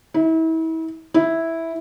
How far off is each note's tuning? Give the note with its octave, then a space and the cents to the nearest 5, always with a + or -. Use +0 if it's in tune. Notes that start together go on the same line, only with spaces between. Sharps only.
E4 -35
E4 -5